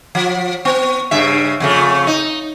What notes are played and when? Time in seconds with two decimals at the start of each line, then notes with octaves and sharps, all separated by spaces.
0.15 F3
0.65 B3
1.11 G2 C#3 E5
1.60 F2 C#3 A3
2.07 D#4